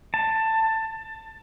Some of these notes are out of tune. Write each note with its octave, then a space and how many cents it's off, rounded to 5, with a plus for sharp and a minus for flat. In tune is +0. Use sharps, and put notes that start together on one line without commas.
A5 +15